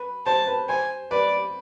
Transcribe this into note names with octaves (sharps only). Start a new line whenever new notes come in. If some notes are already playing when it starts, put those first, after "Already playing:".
Already playing: B4
C5 A5
B4
C5 G#5
B4 D5